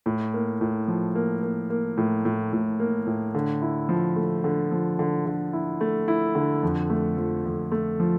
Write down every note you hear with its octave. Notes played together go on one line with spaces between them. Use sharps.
A2
A#3
A2
F3
A#3
A#3
A#3
A2
A2
A2
A#3
A2
D3
E4
F3
A3
D3
F3
D3
D3
E4
A3
E4
D3
F2
A3
F3
F2
A3
F3